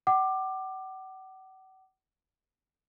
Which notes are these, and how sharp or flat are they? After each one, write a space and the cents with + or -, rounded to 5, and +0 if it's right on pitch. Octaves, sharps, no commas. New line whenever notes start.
F#5 +40 D6 +15